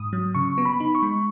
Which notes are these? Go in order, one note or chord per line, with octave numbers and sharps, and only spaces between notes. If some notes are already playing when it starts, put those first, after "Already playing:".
Already playing: G#2 D#6
F#3
C#3 C#6
B3
B5
D#4
C#6
G#3